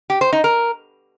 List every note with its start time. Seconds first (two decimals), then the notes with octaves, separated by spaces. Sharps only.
0.10 G4
0.21 C5
0.32 D#4
0.44 A#4